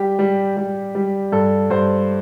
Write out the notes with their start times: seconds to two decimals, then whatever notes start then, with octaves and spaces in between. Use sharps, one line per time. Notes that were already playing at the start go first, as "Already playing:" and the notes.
Already playing: G3 G4
0.19 G3
0.57 G3
0.95 G3
1.32 G2 A4
1.70 G2 C5